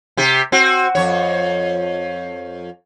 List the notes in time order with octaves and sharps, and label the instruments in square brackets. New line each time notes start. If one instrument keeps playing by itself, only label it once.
[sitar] C3 G4
C4 F#4
F2 C#5